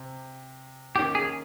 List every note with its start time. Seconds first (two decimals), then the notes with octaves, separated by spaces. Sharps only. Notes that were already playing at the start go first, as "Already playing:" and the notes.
Already playing: C3
0.96 D#3 A#3 C#4 G4
1.15 G#4